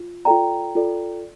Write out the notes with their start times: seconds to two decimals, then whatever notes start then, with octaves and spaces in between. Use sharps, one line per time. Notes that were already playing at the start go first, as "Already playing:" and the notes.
Already playing: F4
0.25 F4 A4 D5 G5 A#5
0.75 F4 A4 D5